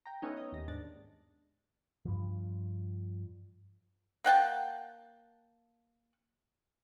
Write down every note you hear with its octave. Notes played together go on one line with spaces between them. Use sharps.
G5 A#5
A3 B3 C#4 D#4
D#5
D#2 A#6
G#2 D4 A6
G2 F3
A#3 F#5 G5 A5